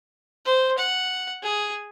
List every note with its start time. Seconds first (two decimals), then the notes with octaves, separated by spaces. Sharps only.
0.45 C5
0.78 F#5
1.42 G#4